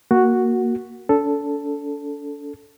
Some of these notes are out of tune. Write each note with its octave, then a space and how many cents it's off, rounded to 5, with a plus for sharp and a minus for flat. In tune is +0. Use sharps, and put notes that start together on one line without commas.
A#3 +0 F#4 +0
D4 -45 A4 +0